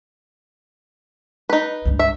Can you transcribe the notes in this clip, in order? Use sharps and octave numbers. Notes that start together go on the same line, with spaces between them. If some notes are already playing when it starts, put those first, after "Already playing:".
D#4 B4
C#2 G2
E5